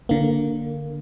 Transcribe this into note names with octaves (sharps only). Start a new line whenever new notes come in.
D3 A#3